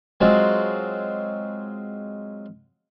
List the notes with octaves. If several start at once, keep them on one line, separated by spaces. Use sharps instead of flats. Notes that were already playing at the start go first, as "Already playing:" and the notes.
F#3 G#3 C4 F4 F#4